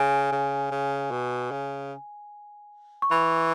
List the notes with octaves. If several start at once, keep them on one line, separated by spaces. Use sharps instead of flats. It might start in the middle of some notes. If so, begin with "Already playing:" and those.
Already playing: C#3 G#5
C#3
C#3
B2
C#3
C#6
E3 B5